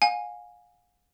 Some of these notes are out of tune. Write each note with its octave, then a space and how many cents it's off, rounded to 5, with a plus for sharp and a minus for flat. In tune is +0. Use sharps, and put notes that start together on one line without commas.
F5 +40 G#5 -10